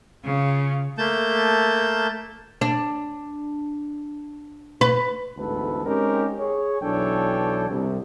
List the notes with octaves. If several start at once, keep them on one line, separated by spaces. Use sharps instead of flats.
C#3 F4
A3 A#3 A5 G6
D4
B4
A1 D2 G#2 B3 A4 B4
G#3 C4 C#4 D#4 G4 A#4
G#4 C#5
B1 E3 D4 A4 C#5 G5
C2